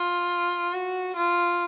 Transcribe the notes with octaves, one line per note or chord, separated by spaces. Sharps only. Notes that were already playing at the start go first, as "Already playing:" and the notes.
Already playing: F4
F#4
F4